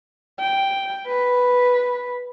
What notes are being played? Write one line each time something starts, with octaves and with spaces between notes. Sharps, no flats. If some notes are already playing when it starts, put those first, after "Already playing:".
G5
B4